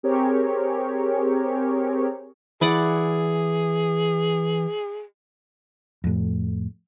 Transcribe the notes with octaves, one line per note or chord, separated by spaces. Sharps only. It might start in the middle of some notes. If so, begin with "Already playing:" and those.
C4 G4 G#4 A#4 C#5
E3 E4 G#4 D5 F#5
F2 A2